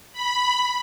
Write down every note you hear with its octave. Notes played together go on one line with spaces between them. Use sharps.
B5